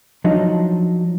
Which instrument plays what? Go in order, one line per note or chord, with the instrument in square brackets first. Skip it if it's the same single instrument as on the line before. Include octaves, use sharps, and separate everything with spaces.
[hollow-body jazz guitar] F3 F#3 D4 D#4